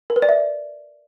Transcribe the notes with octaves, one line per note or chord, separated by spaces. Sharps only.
A#4
B4
D5
E5